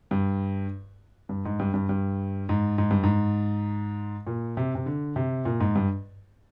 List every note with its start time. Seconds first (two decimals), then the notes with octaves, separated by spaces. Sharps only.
0.11 G2
1.29 G2
1.45 G#2
1.59 G2
1.74 G2
1.89 G2
2.49 G#2
2.78 G#2
2.91 G2
3.03 G#2
4.27 A#2
4.57 C3
4.75 C3
4.86 D3
5.16 C3
5.45 A#2
5.60 G#2
5.75 G2